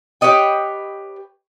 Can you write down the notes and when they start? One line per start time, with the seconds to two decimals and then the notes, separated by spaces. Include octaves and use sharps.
0.21 G4 B4 C#5 D#5 G5